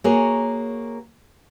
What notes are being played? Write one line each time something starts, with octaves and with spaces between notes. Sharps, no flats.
A#3 F#4 G#4 A#4 C#5